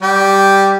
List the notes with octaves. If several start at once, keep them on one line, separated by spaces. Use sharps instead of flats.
G3 G4